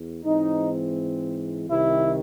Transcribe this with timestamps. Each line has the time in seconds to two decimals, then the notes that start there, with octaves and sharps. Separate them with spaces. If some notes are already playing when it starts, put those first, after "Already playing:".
Already playing: E2
0.25 G#2 E3 C4 D#4
1.69 C2 C3 D#3 E4